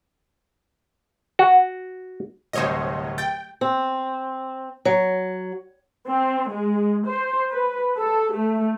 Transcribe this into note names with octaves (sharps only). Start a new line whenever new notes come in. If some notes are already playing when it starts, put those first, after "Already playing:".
F#4
D1 C2 C5 C#5 D#5
G5 A6
C4
F#3
C4
G#3
C5
B4
A4
A3